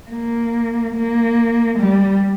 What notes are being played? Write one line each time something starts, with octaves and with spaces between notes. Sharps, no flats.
A#3
A#3
G3